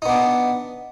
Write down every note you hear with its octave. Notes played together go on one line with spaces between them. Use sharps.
B3 D4 D#4